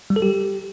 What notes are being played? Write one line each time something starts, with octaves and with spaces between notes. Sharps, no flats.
G3
A4
G4